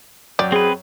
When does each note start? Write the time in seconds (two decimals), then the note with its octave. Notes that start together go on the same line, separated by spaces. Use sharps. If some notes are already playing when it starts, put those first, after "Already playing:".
0.39 F#2 D5 G5
0.52 C4 G#4 B4